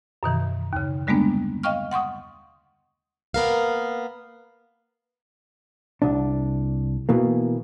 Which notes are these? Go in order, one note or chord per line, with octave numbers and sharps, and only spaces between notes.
F#2 B2 D#3 E3
D#2 C#3
D3 G3 G#3 A#3 B3 D4
D#5 F5 G5 C#6 F6
F#5 C6 C#6 D#6
A#3 B3 A#4 F5
C2 D4
B2 E3 A#3